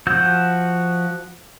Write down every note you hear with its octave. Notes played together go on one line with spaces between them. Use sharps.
F3 F#4 E6 G6